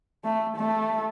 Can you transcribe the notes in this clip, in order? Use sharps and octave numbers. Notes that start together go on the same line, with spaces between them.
A3
A3